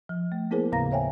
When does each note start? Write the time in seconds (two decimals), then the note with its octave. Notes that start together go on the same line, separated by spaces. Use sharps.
0.09 F3
0.32 A3
0.51 A#3 B3 E4 G#4 A#4 C5
0.72 D#2 A2 C#3 F5 A#5 A#6
0.91 C5 C#5 E5 G5 G#5